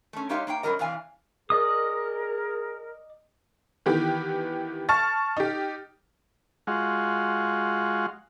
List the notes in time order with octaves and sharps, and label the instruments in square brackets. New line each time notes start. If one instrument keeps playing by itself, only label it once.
[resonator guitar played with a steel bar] A3 C#4
G#3 D#4 G4 C#5 E5 F5
A#3 D#4 F5 G5
F#2 E3 F#3 G3 A#4 D#5
C3 E3 D5 F5 G#5
[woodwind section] G#4 A#4 [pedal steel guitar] D5 D#5 D#6
[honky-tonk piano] D#3 E3 B3 G4
A5 C#6 F6 A6
D#4 G4
[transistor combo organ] G#3 F4 F#4